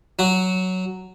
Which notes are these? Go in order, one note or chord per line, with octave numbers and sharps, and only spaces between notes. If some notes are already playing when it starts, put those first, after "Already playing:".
F#3 F#4